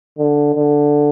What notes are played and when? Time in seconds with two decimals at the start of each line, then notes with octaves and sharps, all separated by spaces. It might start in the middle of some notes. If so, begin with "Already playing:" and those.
0.18 D3
0.55 D3